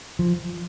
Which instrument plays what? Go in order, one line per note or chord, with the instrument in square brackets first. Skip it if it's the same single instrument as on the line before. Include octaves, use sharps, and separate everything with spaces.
[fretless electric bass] F3